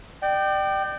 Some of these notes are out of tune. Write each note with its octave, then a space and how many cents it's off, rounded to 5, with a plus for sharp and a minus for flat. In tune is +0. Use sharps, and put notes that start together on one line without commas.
D5 +35 G5 -15